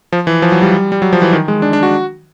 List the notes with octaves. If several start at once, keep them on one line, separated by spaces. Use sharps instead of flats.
F3
E3
F3
F#3
G3
G3
F#3
F3
E3
D#3
G#3
D4
D4
F#4